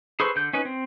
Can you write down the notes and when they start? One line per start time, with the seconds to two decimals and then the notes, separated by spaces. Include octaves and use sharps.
0.20 G#4 A4 B4 C5 C#6
0.36 D3 G6
0.53 C#4 D#4 B4
0.65 C4